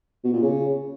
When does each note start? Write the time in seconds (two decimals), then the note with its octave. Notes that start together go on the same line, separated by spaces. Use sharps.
0.24 B2
0.33 A#2
0.42 C#3